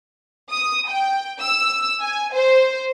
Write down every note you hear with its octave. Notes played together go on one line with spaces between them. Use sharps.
D#6
G5
E6
G#5
C5